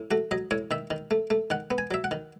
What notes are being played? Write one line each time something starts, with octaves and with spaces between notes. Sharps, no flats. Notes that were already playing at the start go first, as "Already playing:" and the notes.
Already playing: A2
A3 F#4
F#3 D#5
A2 C#5
D#3 E5
D#3
A3
A3
D#3 F#5
B3
G#5
F#3 E5
F#5
D#3